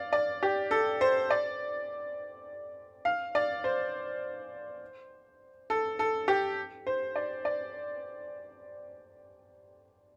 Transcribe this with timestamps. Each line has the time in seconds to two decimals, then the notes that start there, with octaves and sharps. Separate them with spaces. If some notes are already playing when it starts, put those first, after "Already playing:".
Already playing: D5 F5
0.13 D5
0.43 G4
0.71 A4
1.01 C5
1.30 D5
3.05 F5
3.35 D5
3.64 C5
5.70 A4
5.99 A4
6.28 G4
6.87 C5
7.16 D5
7.45 D5